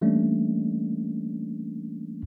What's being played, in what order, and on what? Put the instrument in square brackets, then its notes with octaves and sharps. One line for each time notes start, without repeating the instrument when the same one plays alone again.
[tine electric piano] E3 G3 A3 A#3 C#4 D4